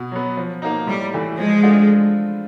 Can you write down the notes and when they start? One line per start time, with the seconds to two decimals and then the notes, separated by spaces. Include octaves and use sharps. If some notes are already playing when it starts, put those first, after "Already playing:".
Already playing: B2
0.12 F#3 B3
0.37 F3
0.62 A#3 D#4
0.87 A2 G3
1.13 E3 A3
1.38 F3 G#3
1.63 A3 D4 F4